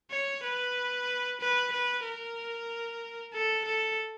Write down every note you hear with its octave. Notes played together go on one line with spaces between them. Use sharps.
C#5
B4
B4
B4
A#4
A4
A4